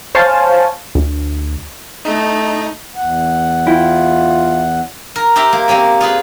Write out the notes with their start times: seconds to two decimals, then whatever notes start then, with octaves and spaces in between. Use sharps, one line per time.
0.15 C5 C#5 F5 G#5 A5
0.95 D2
2.05 A3 D#4
2.96 E2 F#5
3.67 E4 F4 G5
5.16 A#4
5.36 G4 C5 E5 G5 A#5
5.53 A#3
5.68 A#3 C4 C#4 G4
6.01 F4 G#4 B4